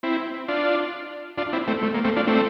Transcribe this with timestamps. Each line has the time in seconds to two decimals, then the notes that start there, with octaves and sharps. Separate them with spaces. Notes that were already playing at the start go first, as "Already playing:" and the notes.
0.03 C4 E4
0.48 D4 F4
1.38 D4 F4
1.53 C4 E4
1.68 A3 C4
1.83 A3
1.94 A#3
2.05 A3 C4
2.16 D4 F4
2.27 A3 C4